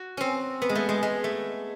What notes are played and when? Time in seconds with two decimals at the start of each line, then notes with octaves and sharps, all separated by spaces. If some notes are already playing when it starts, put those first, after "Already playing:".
Already playing: F#4
0.17 C4 C#4
0.62 B3
0.69 G#3
0.75 A3
0.89 G#3
1.03 G#3
1.24 A3